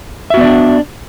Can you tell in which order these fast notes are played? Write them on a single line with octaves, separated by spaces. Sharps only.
E5 F#4 B3 D5 D4